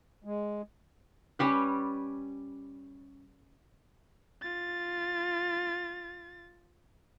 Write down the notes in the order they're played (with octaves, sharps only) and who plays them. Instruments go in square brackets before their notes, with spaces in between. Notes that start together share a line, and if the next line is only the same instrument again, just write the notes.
[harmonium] G#3
[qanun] G3 C#4 G4 B4
[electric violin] F4 A6